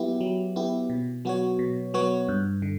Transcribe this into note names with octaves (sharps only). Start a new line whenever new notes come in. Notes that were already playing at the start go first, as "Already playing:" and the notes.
Already playing: F#3 B3 E4 G4
F#3
B3 E4 G4
B2
F#3 B3 F#4 C#5
B2
F#3 B3 F#4 C#5
G2
D3